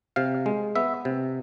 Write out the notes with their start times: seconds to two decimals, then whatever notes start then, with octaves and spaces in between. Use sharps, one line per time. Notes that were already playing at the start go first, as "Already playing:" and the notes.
0.16 C3 F5
0.46 G#3
0.76 B3 E5
1.05 C3